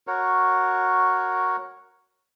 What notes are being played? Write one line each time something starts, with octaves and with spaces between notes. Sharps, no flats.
F#4 A#4 C#5